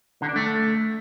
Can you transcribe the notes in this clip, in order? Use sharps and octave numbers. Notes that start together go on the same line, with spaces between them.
D3
D4
A3